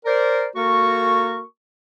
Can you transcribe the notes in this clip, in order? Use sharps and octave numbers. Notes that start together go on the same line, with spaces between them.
A#4 C5 D5
A#3 F#4 A4 A#4 C#6